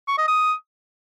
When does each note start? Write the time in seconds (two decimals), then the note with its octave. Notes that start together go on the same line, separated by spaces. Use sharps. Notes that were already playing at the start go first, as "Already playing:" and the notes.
0.08 C#6
0.18 D#5
0.28 D#6